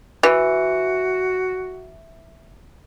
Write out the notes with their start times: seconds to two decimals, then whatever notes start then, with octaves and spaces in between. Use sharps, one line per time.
0.23 E3 F#4